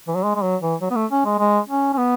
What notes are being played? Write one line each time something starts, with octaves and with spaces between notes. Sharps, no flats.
E3
F#3
G#3
G#3
F#3
E3
F#3
B3
A3
C#4
G#3
G#3
C#4
C#4
B3